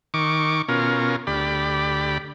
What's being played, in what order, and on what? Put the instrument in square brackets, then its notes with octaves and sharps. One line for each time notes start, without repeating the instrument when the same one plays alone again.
[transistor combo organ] D#3 C#6 D6
B2 C#4 F4 A#4
D2 G4 D5 B5